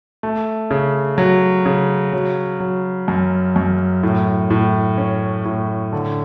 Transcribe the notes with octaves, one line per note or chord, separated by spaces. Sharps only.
A3
C#3
F#3
C#3
F#3
F#3
F#2
F#2
A2
A2
C#4
A2
D3